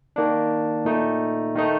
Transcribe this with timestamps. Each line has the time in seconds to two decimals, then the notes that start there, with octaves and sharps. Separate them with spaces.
0.16 D#3 A#3 D4
0.85 A#2 A3 D#4
1.55 D#3 A3 D#4